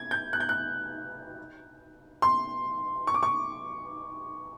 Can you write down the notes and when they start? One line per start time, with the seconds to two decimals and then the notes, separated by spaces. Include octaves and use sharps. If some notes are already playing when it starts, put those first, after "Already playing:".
Already playing: G#6
0.11 G6
0.33 F#6
0.40 G6
0.49 F#6
2.22 C6
3.07 C#6
3.14 D6
3.23 C#6